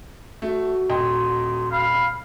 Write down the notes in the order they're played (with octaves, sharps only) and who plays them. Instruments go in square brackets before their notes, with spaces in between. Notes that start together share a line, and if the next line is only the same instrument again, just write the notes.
[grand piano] A3 [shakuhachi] F#4
[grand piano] D#1 D#5 G5 [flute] C6
[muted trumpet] F5 [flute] B5